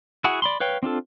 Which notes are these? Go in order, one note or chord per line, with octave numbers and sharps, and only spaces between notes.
E4 F#4 G#4 F#5
D5 B5 C6
B4 C#5 F5 G5
C4 D4 F4 A4